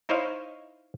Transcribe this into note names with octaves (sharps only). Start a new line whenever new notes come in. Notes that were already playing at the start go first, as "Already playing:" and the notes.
D#4 E4 C5 C#5 D#5 F5